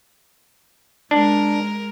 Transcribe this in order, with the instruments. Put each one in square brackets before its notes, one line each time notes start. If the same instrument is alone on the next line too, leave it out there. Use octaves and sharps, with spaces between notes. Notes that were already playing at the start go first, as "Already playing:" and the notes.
[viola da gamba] G#3 A#4 [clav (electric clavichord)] D4